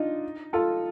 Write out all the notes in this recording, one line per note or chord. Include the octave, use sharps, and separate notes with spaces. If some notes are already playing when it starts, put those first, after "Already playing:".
Already playing: D4 D#4 F4
F4 A4